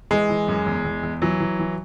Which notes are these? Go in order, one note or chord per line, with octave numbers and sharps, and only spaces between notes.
E3 G#3
E3
F#2
E2
E2
E2
E3 F#3
E3
E3